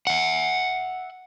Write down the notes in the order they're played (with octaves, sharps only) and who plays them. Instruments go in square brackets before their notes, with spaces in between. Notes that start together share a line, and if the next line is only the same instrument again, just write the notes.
[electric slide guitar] E5 F#5